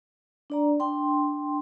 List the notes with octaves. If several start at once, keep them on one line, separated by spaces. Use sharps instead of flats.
D4 D5 A#5
D4 G5 C6